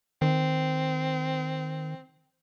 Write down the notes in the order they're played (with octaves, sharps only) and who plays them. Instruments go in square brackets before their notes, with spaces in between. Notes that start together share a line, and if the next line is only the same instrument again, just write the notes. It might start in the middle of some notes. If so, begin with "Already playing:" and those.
[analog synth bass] D#3 [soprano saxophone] C4